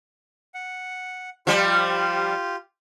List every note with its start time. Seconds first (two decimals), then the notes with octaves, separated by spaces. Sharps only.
0.54 F#5
1.47 F3 G3 F4 G4